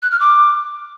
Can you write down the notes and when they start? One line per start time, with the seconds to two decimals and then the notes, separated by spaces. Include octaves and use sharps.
0.02 F#6
0.11 F6
0.20 D6